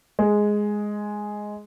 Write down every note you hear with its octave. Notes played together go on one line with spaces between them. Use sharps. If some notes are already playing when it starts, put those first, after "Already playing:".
G#3